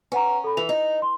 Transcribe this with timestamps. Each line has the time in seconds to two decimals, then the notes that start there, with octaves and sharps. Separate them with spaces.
0.12 C#4 B4 F#5 A#5
0.44 A4 B5
0.57 E3 F7
0.69 D#4
1.02 C6